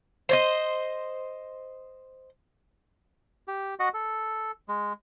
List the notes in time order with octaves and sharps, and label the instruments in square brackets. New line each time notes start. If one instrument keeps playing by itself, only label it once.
[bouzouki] C5 C#5 D#5
[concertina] G4
F#4 D#5 F#5
A4
G#3